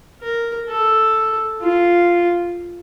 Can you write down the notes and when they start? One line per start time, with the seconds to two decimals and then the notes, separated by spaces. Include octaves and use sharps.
0.22 A#4
0.69 A4
1.62 F4